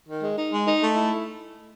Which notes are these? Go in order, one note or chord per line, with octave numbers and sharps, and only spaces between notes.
D#3
G#3
D#4
G#3
D#4
A3
E4